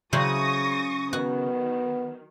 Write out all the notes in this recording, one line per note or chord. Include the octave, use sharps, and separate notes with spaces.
C#3 F#3 E4 C5 C#6 D#6 A#6
D#3 B3 F#4